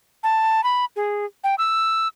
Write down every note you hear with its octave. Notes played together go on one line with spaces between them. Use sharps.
A5
B5
G#4
G5
E6